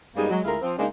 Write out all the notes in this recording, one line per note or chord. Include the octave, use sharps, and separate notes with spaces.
F#2 G3 G#3 A#3 B3 D#4
F#3 G#3
D2 G#3 E4 F4 G#4 A#4
F3 C4
C#3 G#3 A#3 D4 D#4